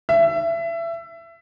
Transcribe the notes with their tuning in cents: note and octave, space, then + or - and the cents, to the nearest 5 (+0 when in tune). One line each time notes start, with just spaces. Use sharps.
E5 +25